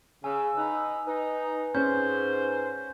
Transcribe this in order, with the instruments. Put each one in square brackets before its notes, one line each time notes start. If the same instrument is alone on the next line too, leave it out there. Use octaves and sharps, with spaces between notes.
[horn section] C#3 [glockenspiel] G#5 [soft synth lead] E6
[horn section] D#4 B4
[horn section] D#4 [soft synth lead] B4
[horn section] G#2 C5 [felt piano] C#4 [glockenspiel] G6